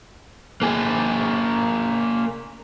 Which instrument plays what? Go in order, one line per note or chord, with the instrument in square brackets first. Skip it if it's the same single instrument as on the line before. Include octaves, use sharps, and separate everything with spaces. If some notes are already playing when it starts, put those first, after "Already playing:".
[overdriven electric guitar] A#3 G#4